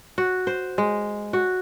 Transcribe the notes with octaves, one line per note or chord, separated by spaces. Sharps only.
F#4
C5
G#3
F#4